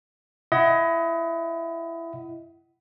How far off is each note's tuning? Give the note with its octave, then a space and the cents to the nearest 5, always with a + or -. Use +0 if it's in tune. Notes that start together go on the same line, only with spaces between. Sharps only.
E4 +15 D#5 +30 F#5 +25